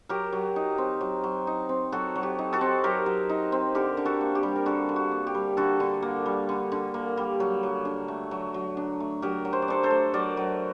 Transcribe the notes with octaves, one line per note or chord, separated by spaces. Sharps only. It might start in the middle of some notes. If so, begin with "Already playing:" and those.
F#3 G4 A#4
F#3
D#4
C4
F#3
F#3
D#4
C4
F#3 F#4 A4
F#3
G4
D#4
F#4 A4
C4
F#3 G4 A#4
F#3
D#4
C4
D3 G4 A#4
D3
F#4 A4
A#3
G4
G3
A#4
D3 F#4 A4
D3
F#4
A#3
G4
G3
D3 F#4 A4
D3
A#3
G3
D3
D3
A#3
G3
F#3
F#3
D4
A3
F#3
F#3
D4
A3
F#3 G4 A#4
F#3
C5
D5
D4 A4 C5
A4 C5
A3
F#3 A#4 D5
F#3